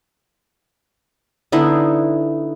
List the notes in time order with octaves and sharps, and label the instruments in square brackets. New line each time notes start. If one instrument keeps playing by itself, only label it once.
[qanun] D3 B3 D#4 E4